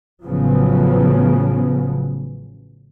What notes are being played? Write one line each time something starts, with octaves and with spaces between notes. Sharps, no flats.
A1 A2 C#3 F3 F#3 B3